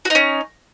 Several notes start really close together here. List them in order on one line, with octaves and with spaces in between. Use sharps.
F#4 D#4 C#4